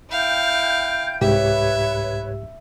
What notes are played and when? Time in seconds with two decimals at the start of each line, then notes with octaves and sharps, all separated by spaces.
0.10 E4 F5 G5 G6
1.21 C2 G#2 G4 B4 C#5 E5